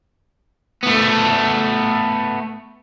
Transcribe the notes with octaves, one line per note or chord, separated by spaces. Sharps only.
A3 B3